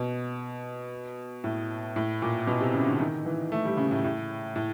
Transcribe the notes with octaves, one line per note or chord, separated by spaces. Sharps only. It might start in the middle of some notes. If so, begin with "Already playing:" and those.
Already playing: B2
A2
A2
A#2
B2
C3
C#3
D3
D#3
E3
A3
G3
C#3
A2
A2
A2